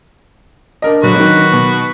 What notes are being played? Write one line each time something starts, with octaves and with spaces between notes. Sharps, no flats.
D4 A#4 D#5
D3 F#3 F#4 B4
D#3 F#3
B2